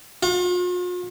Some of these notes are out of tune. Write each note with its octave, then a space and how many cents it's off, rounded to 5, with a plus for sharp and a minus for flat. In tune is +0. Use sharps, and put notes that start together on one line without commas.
F4 +45